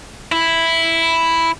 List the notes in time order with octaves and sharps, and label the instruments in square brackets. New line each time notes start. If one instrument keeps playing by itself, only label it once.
[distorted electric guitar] E4